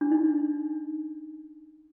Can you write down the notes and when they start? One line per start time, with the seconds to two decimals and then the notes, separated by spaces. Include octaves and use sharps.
0.01 D4
0.12 D#4